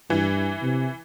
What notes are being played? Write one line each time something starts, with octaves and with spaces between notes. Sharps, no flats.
G2 E3
C3